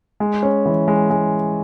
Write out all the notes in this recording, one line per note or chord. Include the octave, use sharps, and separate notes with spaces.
G#3
C#4
E3
G#3
G#3